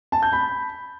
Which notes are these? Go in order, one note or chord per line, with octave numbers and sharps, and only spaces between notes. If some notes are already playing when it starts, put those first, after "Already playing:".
A5
G6
B5